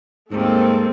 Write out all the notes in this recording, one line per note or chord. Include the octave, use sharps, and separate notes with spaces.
D#2 G#2 D#3 A3 C4 A4